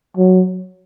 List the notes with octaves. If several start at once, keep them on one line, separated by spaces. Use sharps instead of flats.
F#3